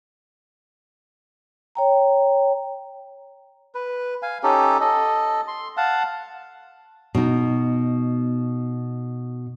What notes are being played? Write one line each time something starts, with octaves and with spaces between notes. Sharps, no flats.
C#5 G5 A#5
B4
F5 G#5
C#4 D#4 G4 A4
A4 D#5
C6
F5 F#5 A5
B2 D#4